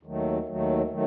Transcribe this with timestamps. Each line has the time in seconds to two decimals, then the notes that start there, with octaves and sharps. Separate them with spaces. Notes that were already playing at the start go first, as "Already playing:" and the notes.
0.03 D#2 D#3 F#3 A3
0.46 D#2 D#3 F#3 A3
0.90 D#3 F#3 A3